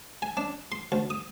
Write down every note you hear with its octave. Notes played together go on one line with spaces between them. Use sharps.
G#5
D4
C6
D2
D#6